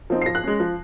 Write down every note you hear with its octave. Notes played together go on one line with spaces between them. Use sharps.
F3 C4 D#4
C7
F3 A#6
F#6
G#3 C#4
F3